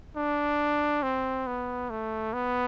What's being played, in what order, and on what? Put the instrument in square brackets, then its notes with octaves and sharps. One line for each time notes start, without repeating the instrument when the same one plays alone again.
[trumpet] D4
C4
B3
A3
B3